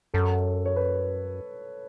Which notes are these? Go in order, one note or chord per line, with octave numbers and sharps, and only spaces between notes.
F#2 A4
C#5
B4